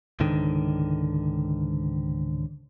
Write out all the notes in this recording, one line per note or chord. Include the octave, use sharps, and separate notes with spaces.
C#2 G#2 D3 D#3